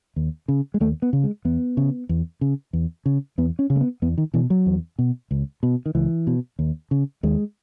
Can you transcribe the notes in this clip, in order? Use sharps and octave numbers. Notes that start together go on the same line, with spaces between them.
D#2
C#3
G#3
D#2 A3
B3
C#3
G#3
E2 B3
C#3
E2
C#3
E2
C#3
E2 B3
C#4
C#3
A3
B3
E2 B3
D#3
B2 E3
F#3
E2
B2
C#2
B2
D#3
C#2 E3
B2
D#2
C#3
D#2 G#3